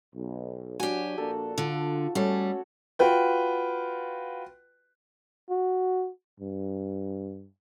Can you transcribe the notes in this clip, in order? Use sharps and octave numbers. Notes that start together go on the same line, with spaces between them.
B1
F#3 D4 F#4 G4 G#5
A#1 A#3 D4 A4
D3 F4
G3 A3 C#4 F#4 A4 C#5
F4 F#4 B4 G5
F#4
G2